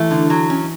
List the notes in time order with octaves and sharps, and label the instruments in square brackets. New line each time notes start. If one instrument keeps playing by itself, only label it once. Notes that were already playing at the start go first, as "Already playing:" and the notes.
Already playing: [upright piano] E3 [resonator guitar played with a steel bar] A3
[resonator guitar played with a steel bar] D3
F#3
C#4